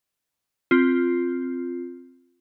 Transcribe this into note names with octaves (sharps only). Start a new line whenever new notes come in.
C4 F4